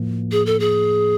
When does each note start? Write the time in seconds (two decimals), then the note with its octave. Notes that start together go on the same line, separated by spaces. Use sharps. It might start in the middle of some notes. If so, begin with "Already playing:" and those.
Already playing: A2 F3 A#3
0.32 G#4
0.46 A4
0.60 G#4